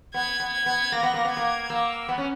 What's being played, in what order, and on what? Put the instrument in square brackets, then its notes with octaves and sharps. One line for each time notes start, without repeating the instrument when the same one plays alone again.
[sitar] B3 [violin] G#6
[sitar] B3
[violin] G#6
[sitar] B3
[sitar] A#3 [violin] A#6
[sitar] B3
A#3
B3
[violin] G#6
[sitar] A#3
[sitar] A#3 [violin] E6
[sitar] B3
C#4